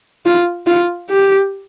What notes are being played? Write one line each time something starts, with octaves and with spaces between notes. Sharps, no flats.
F4
F4
G4